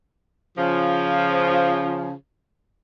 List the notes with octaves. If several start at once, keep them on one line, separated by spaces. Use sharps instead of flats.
C#3 F3